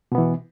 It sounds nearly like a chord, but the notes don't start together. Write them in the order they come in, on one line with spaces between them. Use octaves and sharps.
B2 B3 E3